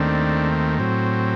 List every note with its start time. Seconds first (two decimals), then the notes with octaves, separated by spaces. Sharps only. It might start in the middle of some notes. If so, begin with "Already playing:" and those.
Already playing: D#2 D#3 A3 C4 D4
0.79 A2 F#3 C4